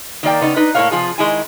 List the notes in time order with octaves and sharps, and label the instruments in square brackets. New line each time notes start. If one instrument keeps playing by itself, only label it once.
[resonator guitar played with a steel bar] D#3 A#3 D5 G5
C#3 B3 D#4
D#4 B4
A2 A#3 C4 C5 C#5 F5
C3 F3 F4 G#4
D#3 G#3 E4 G#5